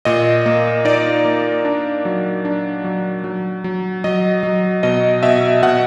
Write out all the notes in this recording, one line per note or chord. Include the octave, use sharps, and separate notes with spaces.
A#2 D#5
A#3
D#4 D5
A#3
D4
F#3
D4
F#3
F#3
F#3
F#3 D#5
F#3
B2 D#5
B2 E5
B2 F#5